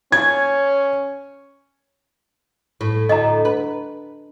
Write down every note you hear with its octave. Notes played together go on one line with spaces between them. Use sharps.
C#4 G#6
A2
D2 A2 D#5 A#5
B4